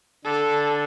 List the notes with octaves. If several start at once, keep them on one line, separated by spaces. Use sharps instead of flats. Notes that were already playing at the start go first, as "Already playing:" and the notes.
D3 A4